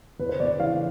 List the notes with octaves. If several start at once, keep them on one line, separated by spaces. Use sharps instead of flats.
E2 B4
C5
E2 D5
E3 F5